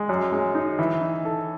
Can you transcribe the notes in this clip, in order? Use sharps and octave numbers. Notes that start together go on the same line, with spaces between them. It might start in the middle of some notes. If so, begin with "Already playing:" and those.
Already playing: G#3
F#2
G#3
D#4
E3
D#4
A4